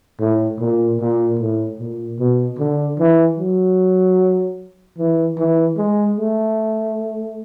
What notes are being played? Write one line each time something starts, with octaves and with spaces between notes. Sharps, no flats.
A2
A#2
A#2
A2
A#2
B2
D3
E3
F#3
E3
E3
G#3
A3